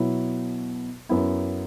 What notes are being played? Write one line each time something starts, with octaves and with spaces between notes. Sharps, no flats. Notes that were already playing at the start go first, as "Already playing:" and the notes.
Already playing: B2 F#3 B3 E4
F#2 F#3 B3 E4